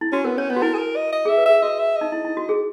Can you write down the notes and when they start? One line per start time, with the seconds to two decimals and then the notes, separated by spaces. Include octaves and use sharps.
0.01 E4
0.13 C#4 F#4
0.24 B3 A#4
0.38 C#4 C#5
0.50 B3 C#5
0.56 F#4
0.62 E4 A#4
0.74 G#4
0.79 A#4
0.96 D#5
1.13 D#5
1.25 G#4 E5
1.37 B4
1.46 G#4 E5
1.62 F#4 D#5
1.79 E5
1.96 D#5
2.01 D#4
2.12 E4
2.25 E4
2.37 F#4
2.49 G#4